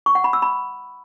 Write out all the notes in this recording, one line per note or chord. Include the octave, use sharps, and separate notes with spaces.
C#6
F#5
B5
E6
B5